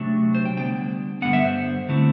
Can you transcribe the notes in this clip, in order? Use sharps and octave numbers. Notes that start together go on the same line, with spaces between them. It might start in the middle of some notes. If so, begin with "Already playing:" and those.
Already playing: C3 F#3 A3 D4
C5
G5
D3 G3 B3 D4 G5
G2 D3 G3 B3 F#5
E5
C5
D3 A3 C4 E4